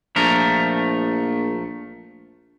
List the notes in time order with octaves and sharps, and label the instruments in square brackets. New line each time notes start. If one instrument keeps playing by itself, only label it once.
[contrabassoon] A#1 [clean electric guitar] F3 A3 A#4